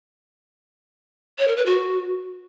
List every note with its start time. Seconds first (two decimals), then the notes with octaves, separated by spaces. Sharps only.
1.39 C#5
1.48 A#4
1.57 B4
1.66 F#4